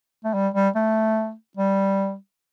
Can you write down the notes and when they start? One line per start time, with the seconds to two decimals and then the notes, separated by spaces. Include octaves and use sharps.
0.25 A3
0.34 G3
0.55 G3
0.75 A3
1.57 G3